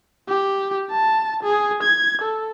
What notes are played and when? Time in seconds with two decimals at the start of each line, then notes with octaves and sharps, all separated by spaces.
0.28 G4
0.90 A5
1.43 G#4
1.83 G#6
2.22 A4